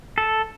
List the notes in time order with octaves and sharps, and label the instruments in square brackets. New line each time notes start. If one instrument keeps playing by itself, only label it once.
[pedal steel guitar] A4